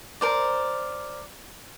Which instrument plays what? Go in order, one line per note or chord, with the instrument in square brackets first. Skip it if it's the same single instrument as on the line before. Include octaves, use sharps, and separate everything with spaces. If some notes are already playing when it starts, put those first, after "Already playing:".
[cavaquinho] A#4 C5 D5